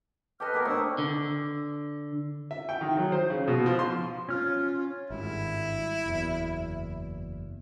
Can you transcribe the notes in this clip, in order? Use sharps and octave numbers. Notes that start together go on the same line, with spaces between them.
G4 A4 B4 D#5 F6
B2 A#3 A#4
A2 D4 C5 C#6 D#6 E6
D3
E5
G5
D#3
F#3
C5
C#3
B2
F3
C6
C#4 F4 F6
G#1 G2 E4
F#1 E2